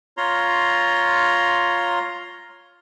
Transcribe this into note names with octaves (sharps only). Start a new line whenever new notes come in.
F4 C#5 A#5 C6